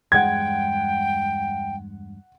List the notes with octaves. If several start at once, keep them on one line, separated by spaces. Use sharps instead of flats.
E2 G2 G#3 F#5 G5 G#6